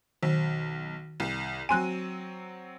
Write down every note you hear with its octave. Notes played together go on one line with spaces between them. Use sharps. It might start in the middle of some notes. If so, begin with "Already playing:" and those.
B1 D#3
C2
F#3 C4 G#5 C6 F#6 D#7